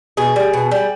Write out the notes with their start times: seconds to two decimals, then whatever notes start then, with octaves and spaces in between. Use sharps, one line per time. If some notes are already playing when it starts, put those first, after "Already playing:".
0.17 B2 G#4
0.36 G3
0.54 B2
0.71 G3